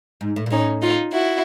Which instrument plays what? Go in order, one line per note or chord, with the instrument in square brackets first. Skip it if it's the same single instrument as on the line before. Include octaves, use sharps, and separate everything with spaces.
[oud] G#2
A2
A#2
[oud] A2 [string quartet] C#4 D#4
[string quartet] D#4 F4
E4 F#4